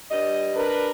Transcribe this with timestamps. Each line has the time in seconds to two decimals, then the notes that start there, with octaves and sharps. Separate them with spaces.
0.11 G2 G3 D#5
0.54 D4 A#4 B4